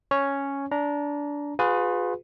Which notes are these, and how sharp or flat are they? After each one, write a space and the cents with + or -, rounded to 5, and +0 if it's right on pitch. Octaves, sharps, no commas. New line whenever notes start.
C#4 +0 C#5 +0
D4 -20 A#5 +0
F4 +40 G#4 -5 B4 +20